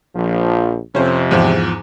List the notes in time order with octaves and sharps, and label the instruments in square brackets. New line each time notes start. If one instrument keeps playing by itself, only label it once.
[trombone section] A#1 F3
[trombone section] F2 C3 [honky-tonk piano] C#4 C5
[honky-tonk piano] E2 G#2 F3